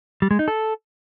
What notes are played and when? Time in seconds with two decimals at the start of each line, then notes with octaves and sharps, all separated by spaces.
0.22 G3
0.31 G#3
0.39 D#4
0.48 A4